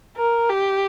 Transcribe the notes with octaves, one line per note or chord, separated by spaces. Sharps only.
A#4
G4